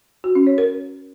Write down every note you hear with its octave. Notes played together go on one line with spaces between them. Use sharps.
F#4
C#4
C#5
A#4